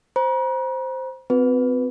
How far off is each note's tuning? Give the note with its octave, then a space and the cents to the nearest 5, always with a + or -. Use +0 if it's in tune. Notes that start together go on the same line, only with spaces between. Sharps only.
C5 +0 A#5 +45
C4 -30 F#4 -45 B4 +0